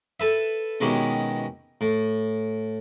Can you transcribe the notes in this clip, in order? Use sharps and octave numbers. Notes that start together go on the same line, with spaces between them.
A4 B4 E5
B2 D#3 G#3 C#4 E4 G4
A2